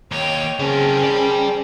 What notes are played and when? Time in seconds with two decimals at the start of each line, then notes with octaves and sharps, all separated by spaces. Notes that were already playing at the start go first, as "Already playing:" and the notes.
0.12 D#2 C#5 G5
0.59 C#3 C4 C#4 G#4 A#4 A5
1.03 D5 G5